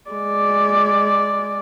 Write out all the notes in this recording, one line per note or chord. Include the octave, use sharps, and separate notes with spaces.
G#3 D5